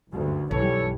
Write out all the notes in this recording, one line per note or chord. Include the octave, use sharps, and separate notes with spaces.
F#1 D2 G2
B1 G2 E3 G3 A4 C#5